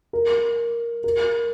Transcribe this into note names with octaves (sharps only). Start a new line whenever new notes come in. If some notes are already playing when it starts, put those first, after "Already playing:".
A#4
A#4